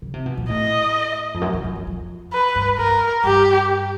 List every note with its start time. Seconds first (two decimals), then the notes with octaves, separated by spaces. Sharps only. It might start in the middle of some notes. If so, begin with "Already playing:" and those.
0.02 C#3
0.14 C3
0.26 B2
0.37 A#2
0.50 A2 D#5
1.34 F2
1.41 F#2
1.53 F2
1.64 F2
1.75 F2
1.87 F2
2.33 B4
2.55 G2
2.78 G2 A#4
3.24 G2 G4